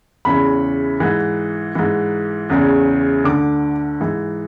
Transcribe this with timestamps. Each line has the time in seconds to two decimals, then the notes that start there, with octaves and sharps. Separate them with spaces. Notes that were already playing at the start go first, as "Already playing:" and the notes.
0.25 E2 C#3 E3 B5
1.00 G#2 E3
1.75 G#2 E3
2.50 E2 C#3 E3
3.24 D2 D3 D6
4.01 G#2 E3